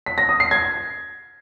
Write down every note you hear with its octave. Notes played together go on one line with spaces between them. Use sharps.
B6
A#6
D#6
C7
G#6